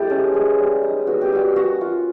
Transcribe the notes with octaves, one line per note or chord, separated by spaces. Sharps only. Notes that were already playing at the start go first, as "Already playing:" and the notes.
Already playing: G#3 B3 E4 G4 A4
C#4
G#3
G3
D#4
B3 F#4
G4
G3 F#4
A#3 F#4
F4